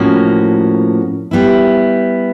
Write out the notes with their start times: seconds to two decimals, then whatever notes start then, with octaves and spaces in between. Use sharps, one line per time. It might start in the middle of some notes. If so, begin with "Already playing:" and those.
Already playing: A2 F3 A#3 C#4 F#4
1.31 G3 B3 E4